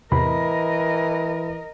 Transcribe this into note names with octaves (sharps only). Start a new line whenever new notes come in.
E2 A2 C3 E3 A#4 D#5 B5